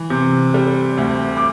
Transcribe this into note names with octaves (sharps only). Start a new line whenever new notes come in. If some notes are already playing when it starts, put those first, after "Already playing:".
Already playing: E3
C3
G3
D2
D6